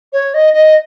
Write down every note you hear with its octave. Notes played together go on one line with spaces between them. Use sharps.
C#5
D#5
D#5